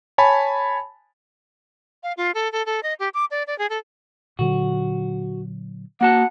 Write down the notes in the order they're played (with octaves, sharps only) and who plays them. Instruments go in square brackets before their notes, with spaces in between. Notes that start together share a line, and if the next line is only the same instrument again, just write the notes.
[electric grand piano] C#5 G#5 A5 B5
[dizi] F5
F4
A4
A4
A4
D#5
G4
D6
D5
D5
G#4
A4
[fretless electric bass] A#2 D3 F#3 [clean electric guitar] F#4
[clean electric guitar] A#3 F#4 A5 [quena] F#5